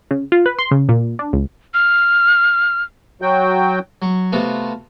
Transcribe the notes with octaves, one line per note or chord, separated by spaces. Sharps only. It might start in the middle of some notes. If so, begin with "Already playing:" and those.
C#3
F4
B4
C6
C#3
A#2
D4
C#2
F6
F#3 F#4 G5
F#3 C#6
C3 A3 B3 F4 F#4